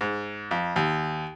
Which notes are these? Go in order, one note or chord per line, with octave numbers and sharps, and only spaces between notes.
G#2
F2
D#2